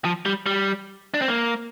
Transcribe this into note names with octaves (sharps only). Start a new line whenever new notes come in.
F3
G3
G3
D4
C4
A#3